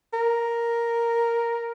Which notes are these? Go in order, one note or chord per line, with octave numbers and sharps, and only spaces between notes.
A#4